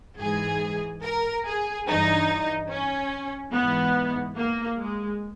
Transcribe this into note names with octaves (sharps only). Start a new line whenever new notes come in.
G#2 E3 G#4
A#4
G#4
G2 E3 D#4
C#4
G#2 E3 B3
A#3
G#3